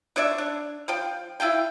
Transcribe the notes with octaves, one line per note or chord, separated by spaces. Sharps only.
D4 C#5 D5 E5
D4
F3 F5 G5
E4 F4 F5 G5